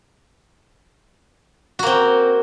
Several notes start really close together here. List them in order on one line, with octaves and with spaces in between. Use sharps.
F#4 A#3 C4